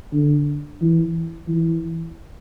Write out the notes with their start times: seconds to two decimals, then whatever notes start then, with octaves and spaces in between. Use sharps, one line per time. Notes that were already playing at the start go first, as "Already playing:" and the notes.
0.13 D3
0.81 E3
1.48 E3